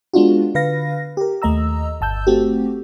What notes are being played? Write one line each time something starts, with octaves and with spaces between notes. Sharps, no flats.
G#3 B3 D4 F4 F#4
D3 B4 F5 A#6
G4 A#4
D#2 A3 D#5 A#5 E6
G1 A5 E6 G6
A3 C4 F#4 G4